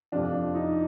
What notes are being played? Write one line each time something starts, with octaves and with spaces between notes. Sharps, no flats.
F2 C3 F3 D4 F4
D#4